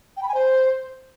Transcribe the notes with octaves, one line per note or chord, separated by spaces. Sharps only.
G5
B5
G#5
C5